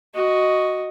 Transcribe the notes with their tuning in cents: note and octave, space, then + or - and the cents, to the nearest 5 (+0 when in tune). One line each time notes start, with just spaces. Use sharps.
F#4 +0 D#5 +0